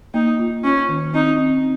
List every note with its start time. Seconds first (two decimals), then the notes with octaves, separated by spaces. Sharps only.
0.14 A#3 D#4
0.39 F4
0.64 C#4 F4
0.89 D#3
1.14 C4 D#4
1.39 C4